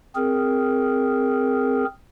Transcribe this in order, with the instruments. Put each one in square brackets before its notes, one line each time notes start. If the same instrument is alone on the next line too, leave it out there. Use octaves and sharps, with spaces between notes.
[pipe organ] C4 G#4 A#4